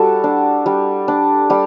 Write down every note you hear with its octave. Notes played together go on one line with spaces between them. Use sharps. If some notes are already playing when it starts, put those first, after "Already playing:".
Already playing: G3 F#4 A4
D4
G3
D4
G3 G4